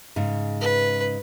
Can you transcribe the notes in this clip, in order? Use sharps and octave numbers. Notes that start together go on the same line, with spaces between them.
G#2 C#3
B4